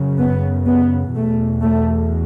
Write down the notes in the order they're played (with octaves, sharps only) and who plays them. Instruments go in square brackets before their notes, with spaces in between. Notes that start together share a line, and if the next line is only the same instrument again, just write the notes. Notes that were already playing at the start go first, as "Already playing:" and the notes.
Already playing: [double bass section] F#2 C#3
B3
B3
E2 B2 A3
A3